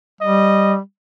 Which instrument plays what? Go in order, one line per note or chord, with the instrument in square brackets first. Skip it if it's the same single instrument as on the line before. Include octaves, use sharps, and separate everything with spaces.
[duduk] G3 [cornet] D#5